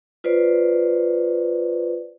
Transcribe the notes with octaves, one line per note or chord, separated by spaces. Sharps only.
F4 B4 C5 D5